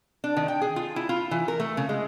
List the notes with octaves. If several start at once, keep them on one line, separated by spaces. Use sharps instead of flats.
D4
D#3
G5
G#4
F4
E4
F4
E3
A#4
A3
C#3
G#3